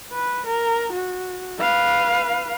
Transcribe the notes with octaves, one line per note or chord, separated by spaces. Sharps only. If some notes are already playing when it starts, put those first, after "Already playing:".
B4
A#4
F#4
B4 F5